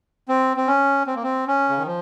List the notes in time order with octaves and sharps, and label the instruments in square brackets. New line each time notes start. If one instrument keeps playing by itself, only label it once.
[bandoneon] C4
C4
C#4
C4
A#3
C4
C#4
C#3
D#3
F3